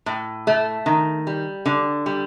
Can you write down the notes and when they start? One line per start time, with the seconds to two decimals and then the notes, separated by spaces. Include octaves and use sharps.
0.06 A2
0.47 A3
0.86 D#3
1.27 G3
1.66 D3
2.06 G3